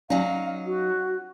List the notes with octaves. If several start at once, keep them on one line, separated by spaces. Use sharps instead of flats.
F#3 C#4 D#4 D5 F5 G#5
F#4